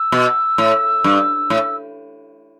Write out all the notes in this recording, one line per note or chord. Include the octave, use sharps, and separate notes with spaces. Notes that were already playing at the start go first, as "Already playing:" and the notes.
Already playing: E6
B2
A2
G2
A2